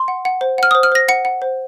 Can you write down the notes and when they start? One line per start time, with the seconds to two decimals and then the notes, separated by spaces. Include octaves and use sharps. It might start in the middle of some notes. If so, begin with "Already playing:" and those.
Already playing: C6
0.08 F#5
0.25 F#5
0.41 C5
0.58 F#5 F6
0.71 C5 D#6
0.83 F6
0.92 C5 A#6
1.08 F#5 C#7
1.25 F#5
1.42 C5